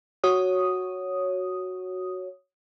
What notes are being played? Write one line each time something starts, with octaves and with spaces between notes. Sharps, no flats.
F#4 C#5 D#6